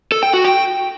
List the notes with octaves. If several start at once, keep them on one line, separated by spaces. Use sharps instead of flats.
A4
G5
F#4
G5